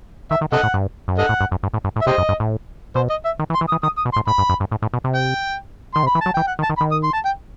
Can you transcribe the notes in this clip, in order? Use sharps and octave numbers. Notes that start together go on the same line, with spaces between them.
D#3 E5
D#3
C3 A4 D#5 F#5
A2
G2
F#2
G2 A4 D#5 F#5
A2
G2
F#2
G2
A2
G2
A2
E5
C3 G4 C5 D#5
F#2
G2
A2
B2 C5
D#5
E5
D#3
E3
C6
E3
D#6
E3
D#3 D#6
D#6
B2
C6
A2
A2 B5
G2
F#2
G2
A2
A2
B2
C3
G5
D#3 C6
C3
B5
E3
F#3 A5
E3 G5
F#5
D#3
A5
D#3
B5
D#3
D#6
C6
A5
G5